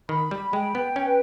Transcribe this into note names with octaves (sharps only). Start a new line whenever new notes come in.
D#3 B5
G3
G#3 G5
B3
C#4 B4